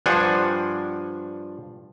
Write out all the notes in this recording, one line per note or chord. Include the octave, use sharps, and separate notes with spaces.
G2 F3 D4 C5 F#5 G#5